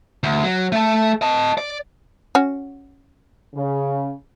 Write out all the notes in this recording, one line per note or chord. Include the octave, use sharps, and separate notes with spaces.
D2
F#3
A3 A5
D#5 A5
D5
C#4 F#4
C#3